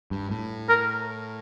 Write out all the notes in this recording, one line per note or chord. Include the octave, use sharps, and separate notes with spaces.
G2
A2
A#4